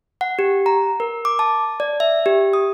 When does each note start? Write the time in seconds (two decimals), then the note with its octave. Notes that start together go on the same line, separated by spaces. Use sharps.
0.21 F#5
0.39 G4
0.66 A#5
1.00 A#4
1.25 D6
1.39 A5
1.80 D5
2.00 E5
2.26 G4
2.53 D#6